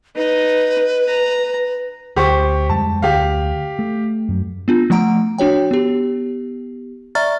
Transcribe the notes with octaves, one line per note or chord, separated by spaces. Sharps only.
D#4 B4
A#5
D2 G4 C5 C#6
F2 G3 G#3 A5
D2 G4 F5
A3
F#2 F#3
B3 D4 F4
F3 A3 F#5 A#5 D7
D4 F#4 C#5 G5
B3 G4
D5 E5 A#5 C#6 F6 A6